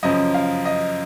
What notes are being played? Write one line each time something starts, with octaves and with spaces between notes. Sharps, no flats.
F#2 C#3 F3 D#5
F5
D#5